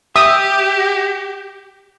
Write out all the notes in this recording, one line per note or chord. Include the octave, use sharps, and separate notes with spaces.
G4 E5 D#6